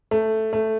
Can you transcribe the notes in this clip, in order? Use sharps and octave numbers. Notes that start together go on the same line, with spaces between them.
A3
A3